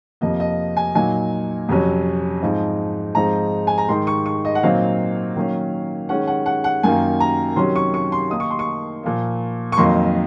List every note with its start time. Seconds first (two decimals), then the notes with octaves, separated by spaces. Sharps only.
0.21 F2 C3 F3 A#3 D#5
0.40 D#5
0.77 G#5
0.95 A#2 F#3 A#3 D#4 G#5
1.69 F2 C3 F#3 C#4
2.42 G#2 F3 C4 D#4
3.15 G#2 F3 G#3 C4 D#4 A#5
3.67 G#5
3.78 A#5
3.88 G#2 D#3 G#3 D#4 C6
4.07 C#6
4.26 C#6
4.45 D#5
4.55 F#5
4.63 A#2 F#3 C4 D#4 F5
5.35 D#3 F#3 A#3 C#4
6.09 D#3 G#3 C#4 F#5
6.27 F#5
6.46 F#5
6.64 F#5
6.83 F#2 D#3 A#3 G#5
7.20 A#5
7.56 C3 D#3 F#3 C#4 C6
7.76 C#6
7.94 C#6
8.12 C6
8.30 D#3 A#3 D#4 D#6
8.40 C#6
8.50 C6
8.59 C#6
9.03 A#2 F3 A#3
9.72 C#6
9.77 F2 D#3 F#3 A#3 D#4 C6